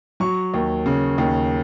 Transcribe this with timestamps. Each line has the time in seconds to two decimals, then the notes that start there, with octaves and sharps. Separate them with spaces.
0.20 F#3 C#6
0.54 D#2
0.86 C#3
1.18 D#2